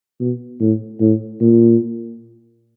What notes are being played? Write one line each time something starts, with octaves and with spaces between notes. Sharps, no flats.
B2
A2
A2
A#2